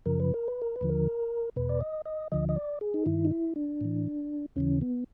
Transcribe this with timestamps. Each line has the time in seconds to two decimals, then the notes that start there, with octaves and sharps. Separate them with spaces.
0.06 F#2 C#3 F3 A#4
0.20 B4
0.34 A#4
0.48 B4
0.62 A#4
0.76 B4
0.81 D#2 D3 F3
0.89 A#4
1.56 E2 B2 B4
1.69 D5
1.81 D#5
2.05 D#5
2.32 D2 D3 F3 D#5
2.49 D#5
2.56 D5
2.81 G#4
2.94 D#4
3.06 G2 D#3 E4
3.25 D#4
3.31 E4
3.56 D4
3.81 A2 E3
4.56 D#2 C#3 E3 C#4
4.81 B3